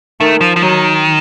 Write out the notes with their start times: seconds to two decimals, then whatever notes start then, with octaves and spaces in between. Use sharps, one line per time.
0.20 D#3 A3
0.41 F3
0.56 F3
0.62 D#3 F#3